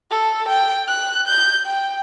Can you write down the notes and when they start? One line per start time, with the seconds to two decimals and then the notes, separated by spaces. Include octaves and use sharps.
0.11 A4
0.48 G5
0.88 F#6
1.27 G6
1.66 G5